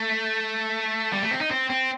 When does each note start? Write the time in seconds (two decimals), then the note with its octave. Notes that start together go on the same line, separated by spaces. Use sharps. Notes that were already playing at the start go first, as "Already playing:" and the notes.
Already playing: A3
1.13 G3
1.23 A3
1.31 C4
1.41 D#4
1.51 C4
1.70 C4